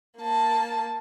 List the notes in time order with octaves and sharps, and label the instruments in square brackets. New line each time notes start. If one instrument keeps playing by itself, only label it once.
[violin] A#3 A5